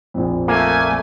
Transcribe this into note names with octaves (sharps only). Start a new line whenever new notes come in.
A#1 F2
A3 A#3 G#5